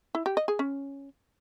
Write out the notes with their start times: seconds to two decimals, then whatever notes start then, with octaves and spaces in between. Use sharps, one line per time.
0.15 E4
0.26 G4
0.37 D#5
0.48 G#4
0.59 C#4